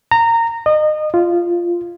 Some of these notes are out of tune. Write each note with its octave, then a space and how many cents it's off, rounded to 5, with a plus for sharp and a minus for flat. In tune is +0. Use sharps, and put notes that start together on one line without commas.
A#5 -20
D#5 -25
F4 -10